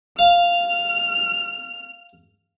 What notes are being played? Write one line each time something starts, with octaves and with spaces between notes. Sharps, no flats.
F5 F6